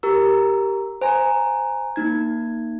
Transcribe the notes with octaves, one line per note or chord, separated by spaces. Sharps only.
G4 A#4 A#5 E6
C5 G#5 A#5
A#3 D#4 G#6